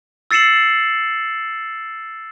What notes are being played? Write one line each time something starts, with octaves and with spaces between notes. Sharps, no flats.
E6 A6 C7 C#7 E7 F#7